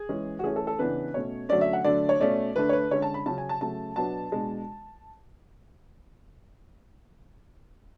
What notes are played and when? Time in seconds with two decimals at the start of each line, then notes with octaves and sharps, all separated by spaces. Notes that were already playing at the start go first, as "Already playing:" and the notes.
Already playing: G#4
0.09 E3 G#3 C#4
0.39 F#4
0.43 E3 A3 C#4 G#4
0.56 A4
0.67 A4
0.79 C#3 E3 B3 D4 B4
1.14 B2 A3 C#4 C#5
1.49 D3 F#3 A3 C#4 D5
1.61 E5
1.73 F#5
1.84 D3 F#3 A3 D4 D5
2.09 C#5
2.20 B2 A3 C#4 D5
2.56 D3 A3 D4 B4
2.69 C#5
2.73 B4
2.91 D3 G#3 C#4 C#5
3.02 A5
3.14 B5
3.26 C#3 F#3 C#4 A5
3.38 G#5
3.49 A5
3.61 C#3 F#3 A3 A5
3.96 B2 F#3 B3 D4 A5
4.32 B2 G#3 D4